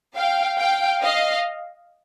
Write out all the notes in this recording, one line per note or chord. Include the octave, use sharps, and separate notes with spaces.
F5 G5
F5 G5
D#5 F5